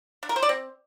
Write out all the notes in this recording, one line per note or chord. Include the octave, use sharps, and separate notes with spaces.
D4
A#4
C5
D5
C4